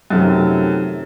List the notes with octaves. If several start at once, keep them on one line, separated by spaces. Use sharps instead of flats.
F#2 C3 D#3 F3 A3